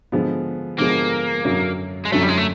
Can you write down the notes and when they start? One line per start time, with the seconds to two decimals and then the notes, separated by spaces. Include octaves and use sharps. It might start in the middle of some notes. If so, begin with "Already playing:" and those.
0.12 D3 F3 G#3 B3
0.79 D3 F3 G#3 A#3 B3
1.45 F#2 D3 F#3
2.05 G#3
2.12 F#2 D3 F#3 A3
2.23 G3
2.29 G#3
2.38 A3